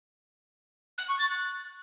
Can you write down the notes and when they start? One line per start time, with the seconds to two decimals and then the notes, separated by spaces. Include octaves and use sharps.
0.98 F#6
1.08 C#6
1.19 A6
1.29 F#6